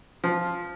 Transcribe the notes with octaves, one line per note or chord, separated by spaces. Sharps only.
F3